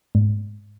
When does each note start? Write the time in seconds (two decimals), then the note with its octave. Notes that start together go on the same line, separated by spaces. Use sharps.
0.15 G#2